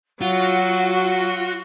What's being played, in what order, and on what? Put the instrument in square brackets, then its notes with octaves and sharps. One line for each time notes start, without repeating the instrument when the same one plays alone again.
[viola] F#3 [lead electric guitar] F4 [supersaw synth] F#4 [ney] F#5